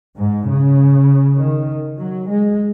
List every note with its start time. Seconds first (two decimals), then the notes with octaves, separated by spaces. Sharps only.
0.17 G#2
0.47 C#3
1.37 D#3
1.98 F#3
2.28 G#3